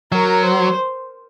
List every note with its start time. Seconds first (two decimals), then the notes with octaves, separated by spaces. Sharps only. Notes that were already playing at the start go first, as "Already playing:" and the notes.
0.12 F#3 A#4
0.43 C5